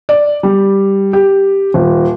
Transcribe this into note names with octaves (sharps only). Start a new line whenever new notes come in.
D5
G3
G4
D#1